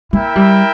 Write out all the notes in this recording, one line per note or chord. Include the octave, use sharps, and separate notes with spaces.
A#3 E4 A#4 E5 G5
G3